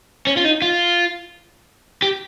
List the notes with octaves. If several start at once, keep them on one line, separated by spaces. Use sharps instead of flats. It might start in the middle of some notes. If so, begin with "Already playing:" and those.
C#4
F4
D#4
F4
G4